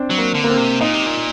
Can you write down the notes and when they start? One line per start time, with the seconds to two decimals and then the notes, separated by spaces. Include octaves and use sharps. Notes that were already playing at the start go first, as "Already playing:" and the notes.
Already playing: C4 D4
0.10 F#3
0.18 A#3
0.34 D3
0.44 A#3
0.50 C4
0.57 C3
0.81 A#2 D#4
0.94 C3
1.06 A#2